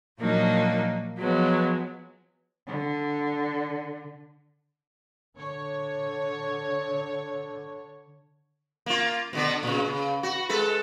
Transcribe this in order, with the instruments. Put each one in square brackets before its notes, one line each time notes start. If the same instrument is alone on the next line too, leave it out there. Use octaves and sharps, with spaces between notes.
[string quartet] A#2 F3 F#3 A#3 D4 D#4
F3 F#3 G#3 B3
[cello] D3
[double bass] D3 [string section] C#5
[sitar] A#3 F4
B2 D3 B3
A#2 C#3
C#3
F#4
G#3 A4 B4